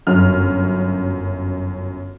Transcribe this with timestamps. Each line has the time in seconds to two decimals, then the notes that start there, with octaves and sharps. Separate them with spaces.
0.07 G1 F#2 F6